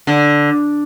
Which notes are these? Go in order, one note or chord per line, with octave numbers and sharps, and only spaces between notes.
D3